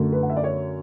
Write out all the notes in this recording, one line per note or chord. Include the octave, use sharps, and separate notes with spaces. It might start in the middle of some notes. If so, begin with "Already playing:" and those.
Already playing: F#2 D3 A3
B4
F#5
E5
D5
C#5